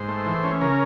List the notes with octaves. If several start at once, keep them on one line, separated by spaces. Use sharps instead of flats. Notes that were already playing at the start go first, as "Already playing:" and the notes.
Already playing: G#2 C5
A3
E3
C#4
C#3 A#4